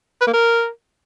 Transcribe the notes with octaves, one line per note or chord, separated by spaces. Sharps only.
B4
A#3
A#4